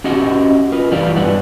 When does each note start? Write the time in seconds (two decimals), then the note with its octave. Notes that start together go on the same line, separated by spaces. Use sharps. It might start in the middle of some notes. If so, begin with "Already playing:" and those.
0.04 C#4 E4 F#4 G4 D#5 F#5
0.72 F4 A#4 B4 D#5
0.91 E3 G3 E4 D5 F5
1.17 G2 G3 B4 C#5 F#5